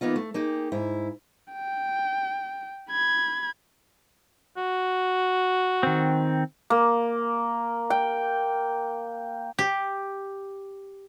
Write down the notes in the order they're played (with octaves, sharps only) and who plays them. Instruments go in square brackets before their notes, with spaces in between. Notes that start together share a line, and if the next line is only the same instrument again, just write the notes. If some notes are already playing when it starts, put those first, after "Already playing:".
[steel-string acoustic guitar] E3 A#3 B3 D#4 F4
A3
A#3 D#4 G4 G#4
G#2 E4
[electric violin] G5
B5 G#6
[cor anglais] F#4
[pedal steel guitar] D#3 C4
[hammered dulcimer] A#3
G5
[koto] G4